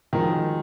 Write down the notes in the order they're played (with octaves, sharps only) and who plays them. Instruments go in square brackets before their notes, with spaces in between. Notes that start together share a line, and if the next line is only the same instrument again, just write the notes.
[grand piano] D#3 [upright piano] F3 G#3 C#4 F#4 A#4